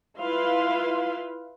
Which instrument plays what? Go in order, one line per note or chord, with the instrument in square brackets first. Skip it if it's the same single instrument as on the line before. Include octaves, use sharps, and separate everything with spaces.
[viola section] E4 F4 B4 F5 C6